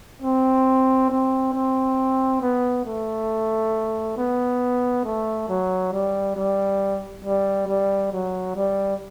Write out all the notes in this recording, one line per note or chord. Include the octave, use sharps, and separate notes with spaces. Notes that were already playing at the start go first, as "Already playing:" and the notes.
C4
C4
C4
B3
A3
B3
A3
F#3
G3
G3
G3
G3
F#3
G3